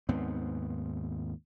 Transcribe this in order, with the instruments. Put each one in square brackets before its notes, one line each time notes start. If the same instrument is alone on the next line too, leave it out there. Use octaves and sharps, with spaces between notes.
[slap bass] D#2 G#2 B3 C4